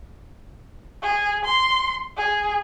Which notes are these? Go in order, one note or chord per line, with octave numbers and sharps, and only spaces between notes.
G#4
C6
G#4